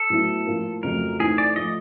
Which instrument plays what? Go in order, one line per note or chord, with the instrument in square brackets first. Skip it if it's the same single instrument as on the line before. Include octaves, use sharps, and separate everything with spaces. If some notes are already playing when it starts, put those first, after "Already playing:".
Already playing: [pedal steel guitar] A4
[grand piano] A2 F#3 B3 E4
A2 F3 A#3
[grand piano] F2 C#3 F#3 A3 [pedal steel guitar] A#4
[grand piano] E3 A3 C4 D#4 [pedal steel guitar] G#4
[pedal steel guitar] D5
[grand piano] F3 A3 [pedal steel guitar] D#5